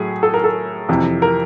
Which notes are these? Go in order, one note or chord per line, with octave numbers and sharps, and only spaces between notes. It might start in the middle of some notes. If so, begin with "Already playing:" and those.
Already playing: A2 F#3 A3 G#4
A4
A#4
A4
F2 C3 E3
A#4